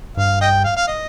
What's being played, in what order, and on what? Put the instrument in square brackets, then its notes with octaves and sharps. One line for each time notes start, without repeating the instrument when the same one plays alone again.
[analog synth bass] G2 [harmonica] F5
[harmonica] D#5 G5
F5
F5
D#5